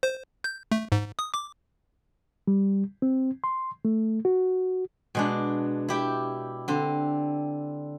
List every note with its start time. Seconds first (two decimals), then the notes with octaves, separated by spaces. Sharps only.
0.03 C5
0.44 G6
0.71 A3
0.92 G#2
1.19 D#6
1.34 D6
2.48 G3
3.02 C4
3.44 C6
3.85 A3
4.25 F#4
5.15 B2 G#3 D4
5.89 E4 G4 G5
6.68 D3 C4